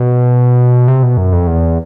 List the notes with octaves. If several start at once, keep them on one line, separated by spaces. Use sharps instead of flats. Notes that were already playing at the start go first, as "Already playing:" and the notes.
Already playing: B2
C3
B2
F#2
F2
E2